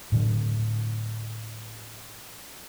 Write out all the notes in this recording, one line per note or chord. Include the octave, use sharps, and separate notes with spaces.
A2 D3 F#3